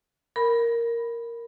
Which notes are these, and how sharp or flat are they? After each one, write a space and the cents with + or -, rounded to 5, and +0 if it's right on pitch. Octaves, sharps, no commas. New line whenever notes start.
A#4 +0 B5 -5